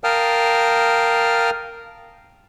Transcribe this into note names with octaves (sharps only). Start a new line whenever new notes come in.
A#4 F5 G5 A5 D#6 F6